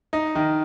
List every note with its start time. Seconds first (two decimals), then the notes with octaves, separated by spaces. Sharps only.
0.13 D#4
0.35 D#3